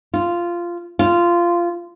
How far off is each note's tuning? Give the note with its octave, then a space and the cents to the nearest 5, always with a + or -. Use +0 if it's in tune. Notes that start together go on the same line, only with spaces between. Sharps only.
F4 -10
F4 -15